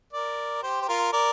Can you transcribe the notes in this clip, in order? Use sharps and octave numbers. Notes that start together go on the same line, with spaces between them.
A#4 D5
G4 C5
C5
F4 A#4
A#4 D5